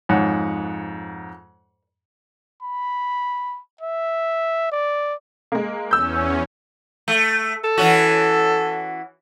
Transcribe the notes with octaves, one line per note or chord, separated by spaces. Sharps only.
F2 G#2 C#5 F#5
B5
E5
D5
G#3 A#3
E2 C#4 E6 G6
A3
A4
E3 C#4 F#4